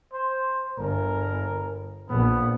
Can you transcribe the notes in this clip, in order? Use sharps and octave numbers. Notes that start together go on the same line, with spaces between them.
C5
G1 A#4
A#1 B3